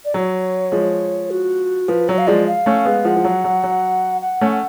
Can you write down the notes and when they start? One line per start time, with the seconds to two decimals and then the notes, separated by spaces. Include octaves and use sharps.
0.05 D5
0.14 F#3 C#5
0.72 F3 G#3
1.31 F#4
1.88 F3 B4
2.08 F#3 C#5
2.18 F5
2.27 F3 G#3 D5
2.47 F5
2.66 A3 C#4
2.85 G#3 B3
3.05 F3 G#3 F#5
3.16 F3
3.24 F#3
3.44 F#3
3.63 F#3
4.21 F#5
4.41 A3 C#4
4.51 F#5